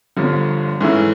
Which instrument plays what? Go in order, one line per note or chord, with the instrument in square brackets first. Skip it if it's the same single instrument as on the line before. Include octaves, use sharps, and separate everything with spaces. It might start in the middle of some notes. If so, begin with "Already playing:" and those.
[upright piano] G1 G2 D3 F3
G#2 E3 A3 C#4 E4